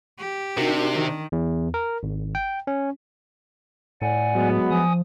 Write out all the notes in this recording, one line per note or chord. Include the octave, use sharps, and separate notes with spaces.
G4
C3 D4 D#4 F#4 A#4
D#3
E2
A#4
G#1
G5
C#4
A2 D5 F#5 G#5
F#3 G#3 B3
F3 G#5 D#6